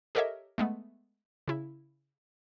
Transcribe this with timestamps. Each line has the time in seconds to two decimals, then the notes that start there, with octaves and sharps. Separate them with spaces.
0.15 G4 A4 A#4 C#5 D#5 E5
0.58 G#3 A3 B3
1.48 C#3 E4